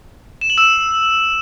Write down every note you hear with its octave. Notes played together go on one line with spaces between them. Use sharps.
E7
F#7
E6 E7